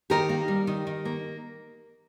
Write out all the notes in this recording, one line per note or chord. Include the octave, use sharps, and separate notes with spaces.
D#3 G4 A#4
A#3
G3
D#3
D#3
A#3